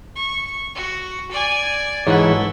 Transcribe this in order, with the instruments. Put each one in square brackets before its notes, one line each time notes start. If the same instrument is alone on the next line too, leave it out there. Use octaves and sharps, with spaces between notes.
[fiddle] C#6
F#4
D5 G#5
[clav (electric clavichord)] G#2 F#5 [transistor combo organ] E3 G#3 C#5 [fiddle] E4 A4